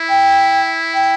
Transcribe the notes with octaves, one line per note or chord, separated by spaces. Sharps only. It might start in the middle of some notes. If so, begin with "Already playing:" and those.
Already playing: E4
G5
G5